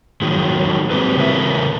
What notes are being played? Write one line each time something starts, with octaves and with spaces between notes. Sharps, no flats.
D#3 F3 F#3 G#3
F#3 G#3 C4 G4 G#4 B4
C#3 E3 A4 A#4 E5